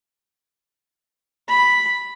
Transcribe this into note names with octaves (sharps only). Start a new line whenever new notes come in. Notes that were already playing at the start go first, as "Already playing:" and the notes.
B5